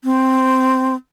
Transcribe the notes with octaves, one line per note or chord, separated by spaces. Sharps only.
C4